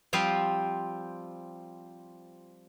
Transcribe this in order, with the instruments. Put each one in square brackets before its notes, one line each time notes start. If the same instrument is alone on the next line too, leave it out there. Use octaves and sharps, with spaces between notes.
[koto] F3 G3 C4 F4 G4